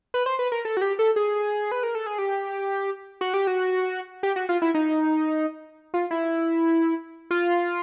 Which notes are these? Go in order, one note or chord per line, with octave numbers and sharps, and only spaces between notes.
B4
C5
B4
A#4
A4
F#4
G4
A4
G#4
B4
A#4
A4
G#4
G4
F#4
G4
F#4
G4
F#4
F4
E4
D#4
F4
E4
F4